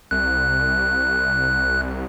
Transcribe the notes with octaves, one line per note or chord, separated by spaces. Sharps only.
C2 F#6